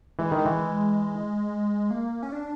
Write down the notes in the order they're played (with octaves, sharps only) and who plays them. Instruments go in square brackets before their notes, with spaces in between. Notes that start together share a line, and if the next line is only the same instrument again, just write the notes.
[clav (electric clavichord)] E3 [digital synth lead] G#3
[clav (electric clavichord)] D#3 [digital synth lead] G3
[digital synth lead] G#3
[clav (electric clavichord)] E3
[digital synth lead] A#3
C#4
D4